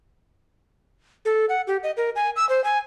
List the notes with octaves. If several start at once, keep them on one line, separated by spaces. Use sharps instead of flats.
A4
F#5
G4
D#5
A#4
G#5
E6
C5
G#5